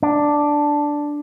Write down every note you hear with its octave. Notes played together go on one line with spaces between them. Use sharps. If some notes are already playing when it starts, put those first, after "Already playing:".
D4